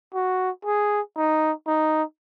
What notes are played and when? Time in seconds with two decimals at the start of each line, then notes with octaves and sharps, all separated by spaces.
0.14 F#4
0.65 G#4
1.16 D#4
1.67 D#4